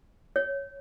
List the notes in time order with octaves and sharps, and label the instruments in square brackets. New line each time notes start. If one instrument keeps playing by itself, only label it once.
[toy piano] C#5